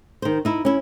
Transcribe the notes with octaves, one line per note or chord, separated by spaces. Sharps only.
D#3 C5
D#4 E4
C#4 E4